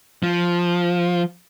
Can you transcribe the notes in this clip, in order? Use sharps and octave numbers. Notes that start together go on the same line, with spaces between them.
F3